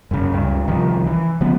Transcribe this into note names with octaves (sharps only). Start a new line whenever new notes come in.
F#2 C#3
C#2 G2
C2 D#3 F3
E3
C#3 F3 G#3 B3